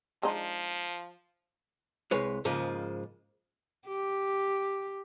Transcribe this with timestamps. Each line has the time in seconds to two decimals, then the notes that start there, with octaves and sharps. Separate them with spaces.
0.23 F3 G#3 D4 D#4
2.11 C2 G#3 B4 C#5
2.45 G#2 C#3 F3 G#3 A#3
3.88 G4